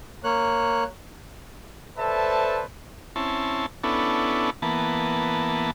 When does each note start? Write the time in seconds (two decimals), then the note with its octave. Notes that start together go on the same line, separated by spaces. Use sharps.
0.24 A#3 C#5 F#6
1.98 A4 B4 C5 D5 E5 A5
3.16 C4 C#4 E4 A5
3.84 B3 C#4 D4 E4 A4
4.62 E3 A#3 B3 A5